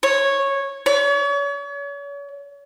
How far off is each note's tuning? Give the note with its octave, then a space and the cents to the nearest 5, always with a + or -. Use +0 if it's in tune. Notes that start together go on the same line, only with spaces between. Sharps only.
C#5 -10
C#5 +40